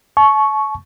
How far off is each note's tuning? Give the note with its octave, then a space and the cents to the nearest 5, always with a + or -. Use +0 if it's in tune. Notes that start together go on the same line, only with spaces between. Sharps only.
A5 -40 C#6 +0